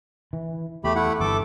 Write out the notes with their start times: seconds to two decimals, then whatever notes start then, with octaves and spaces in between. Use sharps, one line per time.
0.33 E3
0.84 E2 A3 G4 B5
0.96 A3 E4 F#5
1.20 G1 E3 A4 D6